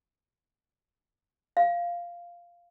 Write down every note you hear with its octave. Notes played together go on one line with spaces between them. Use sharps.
F5